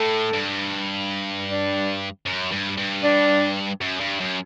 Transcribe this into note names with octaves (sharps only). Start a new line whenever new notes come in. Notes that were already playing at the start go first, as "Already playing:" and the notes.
Already playing: A2 A4
G2
D4
F#2
G2
G2
D4
F#2
G2
F#2